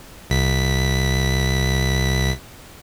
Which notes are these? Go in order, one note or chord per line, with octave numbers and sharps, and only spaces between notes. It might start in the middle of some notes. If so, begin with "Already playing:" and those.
C2 B6